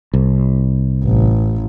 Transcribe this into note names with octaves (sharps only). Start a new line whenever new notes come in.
C2
A1